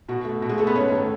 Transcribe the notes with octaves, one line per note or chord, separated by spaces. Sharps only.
B2 F#4
A3
B2 F#4
G#3 G#4
A3 A4
B3 B4
G#2 C#4 C#5
D#3 A3